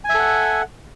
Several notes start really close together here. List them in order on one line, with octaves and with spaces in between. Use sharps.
G#5 E5 A4 F#5